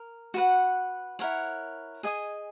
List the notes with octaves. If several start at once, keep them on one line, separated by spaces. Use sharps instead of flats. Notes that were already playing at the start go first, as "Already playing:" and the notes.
Already playing: A#4
F#4 B4 F#5
E4 A#4 C#5 F#5
G#4 D#5 G#5 D#6